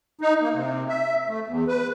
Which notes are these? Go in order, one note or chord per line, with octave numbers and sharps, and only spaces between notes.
D#4
A#3
C3
E5
A3
E2
B4